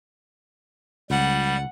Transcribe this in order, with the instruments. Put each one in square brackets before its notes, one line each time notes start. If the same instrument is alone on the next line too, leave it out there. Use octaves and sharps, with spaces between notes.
[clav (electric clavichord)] C#2 [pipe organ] G3 [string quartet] F#5